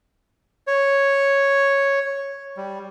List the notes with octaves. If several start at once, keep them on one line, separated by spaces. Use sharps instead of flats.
C#5
G3